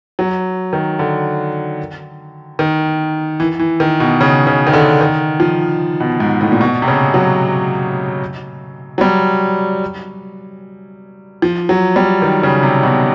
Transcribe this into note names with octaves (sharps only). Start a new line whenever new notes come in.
F#3
D#3
D3
D#3
E3
E3
D#3
B2
C#3
C#3
D#3
D3
D#3
F3
B2
G#2
A2
A#2
B2
C3
C#3
F#3
F#3
G3
F3
F#3
G3
D#3
C#3
C3
B2